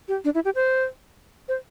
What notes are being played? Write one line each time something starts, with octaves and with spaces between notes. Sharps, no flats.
G4
D4
E4
G4
C5
C5